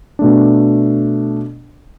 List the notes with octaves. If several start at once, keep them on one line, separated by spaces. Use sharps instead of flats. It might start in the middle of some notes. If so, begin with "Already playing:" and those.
B2 A3 D4